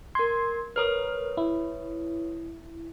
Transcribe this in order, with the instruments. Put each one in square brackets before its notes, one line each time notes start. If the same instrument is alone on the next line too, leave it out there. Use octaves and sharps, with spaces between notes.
[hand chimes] A#4 G#6 [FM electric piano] C6
[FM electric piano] A#4 F6 [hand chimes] B4 C#5 D#6
[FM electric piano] E4